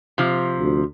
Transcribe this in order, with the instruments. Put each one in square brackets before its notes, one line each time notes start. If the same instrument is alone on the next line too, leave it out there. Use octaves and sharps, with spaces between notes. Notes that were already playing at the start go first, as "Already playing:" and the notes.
[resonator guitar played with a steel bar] C3 F3
[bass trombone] D2